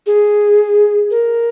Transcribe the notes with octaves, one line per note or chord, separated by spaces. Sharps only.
G#4
A#4